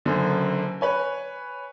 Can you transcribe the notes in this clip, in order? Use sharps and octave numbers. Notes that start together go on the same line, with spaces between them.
F#1 F#2 D3
B4 C#5 G#5